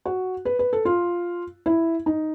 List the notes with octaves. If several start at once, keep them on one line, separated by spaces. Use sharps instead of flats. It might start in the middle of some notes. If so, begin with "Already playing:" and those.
F#4
B4
B4
A4
F4
E4
D#4